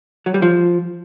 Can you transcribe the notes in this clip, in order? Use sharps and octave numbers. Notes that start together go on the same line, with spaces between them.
F#3
G3
F3